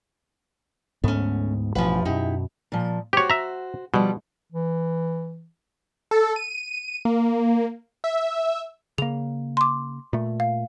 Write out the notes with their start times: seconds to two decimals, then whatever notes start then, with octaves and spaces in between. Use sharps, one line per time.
1.04 D2 G#2 A3 B3 C#4
1.75 A1 G2 B2 F3 B4
2.05 F#2 B2 D#4 E4 G4
2.72 A#2 F3
3.13 F#4 G4 C5 C#5
3.30 E5 A#5
3.94 B2 F3 G3
4.52 E3
6.11 A4
6.36 D#7
7.05 A#3
8.04 E5
8.98 C#3 A#3 F7
9.57 C6 D6
10.13 A#2 A3
10.40 F5